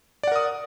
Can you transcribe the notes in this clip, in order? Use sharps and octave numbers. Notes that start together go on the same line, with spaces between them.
A#4 D5 F#5 D#6